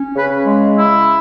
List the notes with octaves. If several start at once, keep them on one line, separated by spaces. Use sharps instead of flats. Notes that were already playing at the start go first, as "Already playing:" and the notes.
Already playing: C#4
C#3 B4
G#3
E4